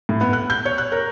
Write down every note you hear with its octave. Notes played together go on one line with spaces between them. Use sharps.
A2
B3
F#6
G6
C#5
F#6
A#4